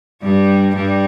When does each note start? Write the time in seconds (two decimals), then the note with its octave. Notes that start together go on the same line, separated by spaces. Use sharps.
0.22 G2 G3
0.76 G2 G3